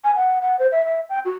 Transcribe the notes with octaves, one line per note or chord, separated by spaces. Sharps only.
G#5
F#5
F#5
C5
E5
E5
G5
F#4